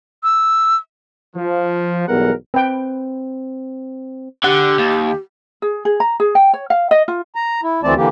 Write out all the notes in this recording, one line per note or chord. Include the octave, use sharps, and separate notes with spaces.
E6
F3
B1 E2 G3 B3 A#4 F#5
C4 B4 G5
D3 G4 F#5
D#2
G#4
G#4
A#5
G#4
G5
C#5
F5
D#5
F4
A#5
E4
D2 E3 A3 C4 D5 A5
D3 E3 A#3 G4